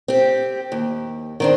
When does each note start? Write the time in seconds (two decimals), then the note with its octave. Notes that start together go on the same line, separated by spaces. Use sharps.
0.08 C4 G4
0.72 D#2
1.40 D#3 C4 D4